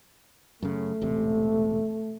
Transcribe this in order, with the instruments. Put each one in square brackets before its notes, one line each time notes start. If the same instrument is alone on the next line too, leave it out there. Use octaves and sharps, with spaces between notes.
[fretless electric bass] F#2 C#3 [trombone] A3
[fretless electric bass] E1 A1 C3